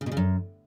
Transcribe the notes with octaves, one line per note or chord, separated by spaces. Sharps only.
C#3
B2
C#3
F#2